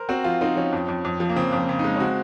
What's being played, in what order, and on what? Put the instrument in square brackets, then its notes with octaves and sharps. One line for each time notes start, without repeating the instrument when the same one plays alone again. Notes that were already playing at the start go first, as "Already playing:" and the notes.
Already playing: [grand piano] A#4 C5
[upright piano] C4 [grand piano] F#4
[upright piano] F3 [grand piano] F4
[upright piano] C4 [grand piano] D#4
[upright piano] F3 [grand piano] C#4
[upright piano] F2
F2
F2
F3
[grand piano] A#3
[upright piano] C#3 [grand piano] C4
[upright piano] F2
[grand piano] C4
[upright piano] C#3
[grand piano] D#4
[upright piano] G#3
[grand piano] C#4
[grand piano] C4 [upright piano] F#4